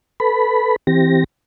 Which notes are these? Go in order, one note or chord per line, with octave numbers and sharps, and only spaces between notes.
A4 B4 B5
E3 C4 G4 A#6